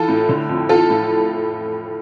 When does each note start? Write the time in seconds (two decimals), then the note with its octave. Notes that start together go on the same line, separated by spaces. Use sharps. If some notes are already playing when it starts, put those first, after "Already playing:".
Already playing: E3 F4 A4
0.08 A2
0.29 D3
0.49 F2
0.69 E3 F4 A4
0.89 A2